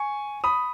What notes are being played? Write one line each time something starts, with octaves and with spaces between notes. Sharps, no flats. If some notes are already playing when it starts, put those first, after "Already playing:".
Already playing: G#5 C#6
B5 D#6